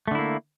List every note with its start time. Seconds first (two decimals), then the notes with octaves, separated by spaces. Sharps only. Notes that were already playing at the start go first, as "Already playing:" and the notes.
0.08 A3
0.11 D3
0.15 E4
0.19 A#3